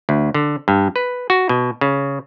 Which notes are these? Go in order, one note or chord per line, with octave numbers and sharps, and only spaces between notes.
D2
D3
G2
B4
F#4
B2
C#3